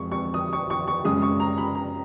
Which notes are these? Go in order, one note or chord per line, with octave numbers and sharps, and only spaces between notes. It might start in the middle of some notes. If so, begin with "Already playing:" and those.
Already playing: F2 F3 G#3 C#6
C#6
D#6
C#6
C#6
C#6
F#2 C#3 G#3 D#6
C#6
A#5
B5
A#5